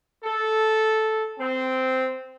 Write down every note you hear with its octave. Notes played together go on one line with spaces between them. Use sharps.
A4
C4